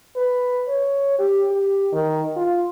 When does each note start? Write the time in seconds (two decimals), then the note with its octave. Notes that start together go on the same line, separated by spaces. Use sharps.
0.16 B4
0.68 C#5
1.19 G4
1.51 G4
1.93 D#3
2.36 F4